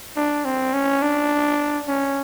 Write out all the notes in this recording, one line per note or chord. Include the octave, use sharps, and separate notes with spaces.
D4
C4
C#4
D4
C#4